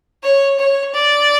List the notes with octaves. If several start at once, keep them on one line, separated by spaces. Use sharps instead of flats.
C#5
C#5
D5